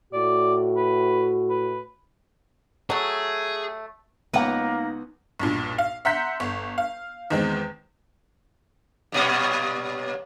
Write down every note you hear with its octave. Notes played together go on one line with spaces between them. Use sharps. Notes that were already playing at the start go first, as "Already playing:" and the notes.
A2 F#4 D5
B4
B4
F#3 A3 G#4
C#2 A#3 B3 D#4 B4 F#5
B1 G2 A#2
F5
E5 F#5 A#5 C6 G6 B6
G1
F5
E2 D#3 G#3 C4
G2 A#2 C#4